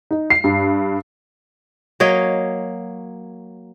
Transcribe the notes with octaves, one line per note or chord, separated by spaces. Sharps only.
D#4
C7
G2
F#3 A#3 C#5 D#5